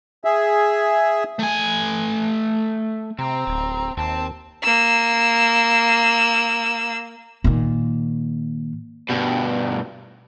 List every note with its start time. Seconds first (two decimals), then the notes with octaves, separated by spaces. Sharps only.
0.25 G#4 E5
1.39 A3 G#5
3.19 C3 C4 A#5
3.47 D1
3.97 D#2 C4 A5
4.64 A#3 E6
7.44 A#2 D#3
9.10 G2 B2